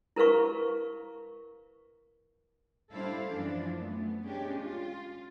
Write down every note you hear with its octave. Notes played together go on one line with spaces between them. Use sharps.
E4 A#4 B4 F5 C#6
G3 D4 E4 A4 C5 F5
F#2 E3 F3 D4
A3 B3
G#3 C#4 D4 G4
F4